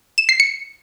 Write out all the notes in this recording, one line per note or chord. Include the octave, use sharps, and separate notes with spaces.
E7
C7
C#7